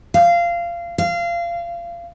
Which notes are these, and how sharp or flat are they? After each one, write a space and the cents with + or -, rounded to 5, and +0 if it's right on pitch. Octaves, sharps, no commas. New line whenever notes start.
F5 -20
F5 -25